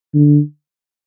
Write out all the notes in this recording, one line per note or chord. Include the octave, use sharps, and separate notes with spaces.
D3